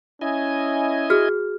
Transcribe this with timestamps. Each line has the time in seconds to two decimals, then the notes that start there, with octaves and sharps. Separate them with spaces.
0.21 C#4 E4 D#5 G#5
1.10 F#4 G#4 F6